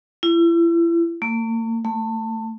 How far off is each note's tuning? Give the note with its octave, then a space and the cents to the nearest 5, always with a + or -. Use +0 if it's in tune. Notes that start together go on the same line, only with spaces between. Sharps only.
E4 +35
A#3 -45
A3 +25